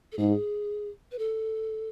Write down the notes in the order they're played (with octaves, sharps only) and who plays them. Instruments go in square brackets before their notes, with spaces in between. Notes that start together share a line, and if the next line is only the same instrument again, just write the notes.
[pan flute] A4
[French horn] G#2 [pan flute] G#4
[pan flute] B4
A4